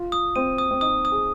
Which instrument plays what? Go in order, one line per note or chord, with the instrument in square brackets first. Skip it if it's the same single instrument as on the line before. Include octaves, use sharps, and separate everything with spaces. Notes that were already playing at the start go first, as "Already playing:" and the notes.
Already playing: [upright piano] F4
[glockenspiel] D#6
[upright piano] C4 [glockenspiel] D#7
[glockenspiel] D#6
[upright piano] C4
[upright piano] D#4 [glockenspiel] D#6
[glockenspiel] D#6
[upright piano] G#4